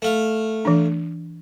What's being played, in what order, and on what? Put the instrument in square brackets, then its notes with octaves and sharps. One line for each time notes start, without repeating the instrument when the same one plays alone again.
[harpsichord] A3 F5
[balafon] E3 D4